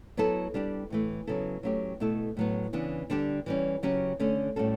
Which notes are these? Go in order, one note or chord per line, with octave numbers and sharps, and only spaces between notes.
F#3 B3 E4 A4
G3 D4 G4
A2 E3 A3
C#3 F#3 B3 E4 A4
F#3 A3 C#4 E4 G4
B2 A3 E4 A4
A2 F#3 B3
C#3 E3 B3 D4
D3 G3 D4 G4
E3 G3 C#4
C#3 F#3 C#4 G4
D3 A3 C#4
A2 G3 C#4 F#4 A4